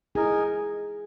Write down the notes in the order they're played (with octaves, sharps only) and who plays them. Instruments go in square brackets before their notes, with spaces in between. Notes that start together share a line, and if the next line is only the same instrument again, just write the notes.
[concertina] D#4 A#4 D#5 G#5 [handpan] E4 G#4